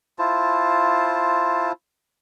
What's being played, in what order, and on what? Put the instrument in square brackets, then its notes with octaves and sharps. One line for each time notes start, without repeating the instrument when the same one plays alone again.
[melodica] E4 F4 C5 A5